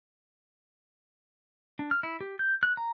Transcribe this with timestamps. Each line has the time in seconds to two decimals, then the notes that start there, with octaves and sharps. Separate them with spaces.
1.79 D4
1.91 F6
2.03 E4
2.21 G4
2.39 G6
2.63 F#6
2.77 A#5